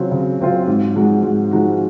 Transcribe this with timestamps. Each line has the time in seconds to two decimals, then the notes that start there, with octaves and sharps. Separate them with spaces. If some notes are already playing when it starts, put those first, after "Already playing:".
Already playing: C#3 F#3 C4 F4
0.11 C#3
0.40 F#3 C4 F4
0.67 G#2
0.95 F3 G#3 D#4 F#4
1.23 G#2
1.51 F3 G#3 D#4 F#4